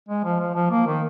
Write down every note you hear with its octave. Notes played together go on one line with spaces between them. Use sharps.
G#3
F3
F3
F3
A#3
D#3